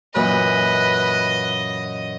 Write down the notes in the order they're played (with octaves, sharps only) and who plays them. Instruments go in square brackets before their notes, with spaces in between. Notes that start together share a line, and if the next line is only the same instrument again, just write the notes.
[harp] F#2 A#2 E3 [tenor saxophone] B4 [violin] D#5